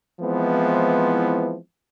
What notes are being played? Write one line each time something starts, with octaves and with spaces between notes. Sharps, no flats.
E3 F3 G#3 B3 C4 E4